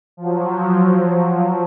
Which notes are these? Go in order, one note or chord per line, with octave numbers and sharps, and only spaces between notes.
F3 F#3